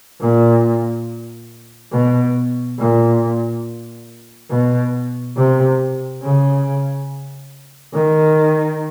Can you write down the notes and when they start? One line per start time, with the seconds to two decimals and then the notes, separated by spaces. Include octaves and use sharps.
0.20 A#2
1.92 B2
2.78 A#2
4.50 B2
5.37 C3
6.22 C#3
7.94 D#3